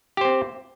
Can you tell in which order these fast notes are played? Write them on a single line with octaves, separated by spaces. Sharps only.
G4 C5 C4